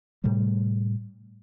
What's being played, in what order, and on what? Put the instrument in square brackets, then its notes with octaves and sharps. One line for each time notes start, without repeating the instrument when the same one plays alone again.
[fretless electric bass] A2 C3 G3 A3